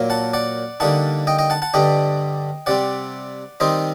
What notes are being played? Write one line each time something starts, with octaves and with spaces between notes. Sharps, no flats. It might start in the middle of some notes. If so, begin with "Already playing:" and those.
Already playing: A#2 F#3 A#3
F#5 A5
D5 F#5
D3 G3 A#3 D#4 F#5 A5
D#5 G5
D#5 G5
F#5 A5
F#5 A5
G2 D3 G3 D4 D#5 G5
C3 G3 C4 D5 F#5
D#3 G3 C4 D#4 C5 D#5